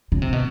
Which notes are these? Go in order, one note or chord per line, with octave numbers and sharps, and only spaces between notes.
C#3
C3
B2